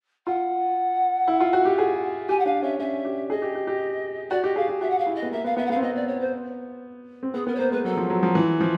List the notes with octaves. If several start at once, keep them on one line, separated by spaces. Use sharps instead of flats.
F4 F#5
E4
F4
F#4
G4
G#4
G4 G#5
F#5
D4 F5
C#4 E5
C#4 E5
G4
G#4 D#5
G4
G4
G4
F#4 D5
G4 D#5
G#4 F5
G4
F#4 E5
F#5
F5
E4
D#5
B3
A#3 E5
B3 F5
B3 E5
F#5
B3 F5
C4
B3 D#5
D5
C#5
C5
C4
B3 G#4
B3 A#4
C#5
A#3 C5
G#3 B4
F#3 A4
F3
F#3
F3
E3 E4
F3